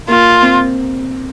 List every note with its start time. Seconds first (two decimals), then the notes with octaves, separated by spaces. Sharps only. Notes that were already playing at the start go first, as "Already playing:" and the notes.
0.08 A#3 F4
0.42 C4